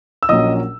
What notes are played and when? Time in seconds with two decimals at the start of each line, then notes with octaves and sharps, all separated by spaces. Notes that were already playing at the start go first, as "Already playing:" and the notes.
0.23 E6
0.29 A#1 A#2 F#3 A#3 C#4 D#5 D#6